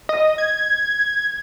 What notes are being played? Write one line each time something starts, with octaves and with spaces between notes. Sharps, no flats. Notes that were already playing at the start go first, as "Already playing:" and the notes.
D#5
G#6